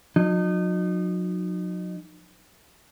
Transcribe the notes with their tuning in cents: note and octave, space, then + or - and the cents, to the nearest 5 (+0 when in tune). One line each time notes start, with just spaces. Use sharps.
F#3 -35 D#4 -25